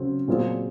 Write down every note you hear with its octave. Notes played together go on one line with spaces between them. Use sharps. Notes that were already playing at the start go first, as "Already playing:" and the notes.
Already playing: C#3 F#3 C4
A#2 F#3 C4 F4 G#4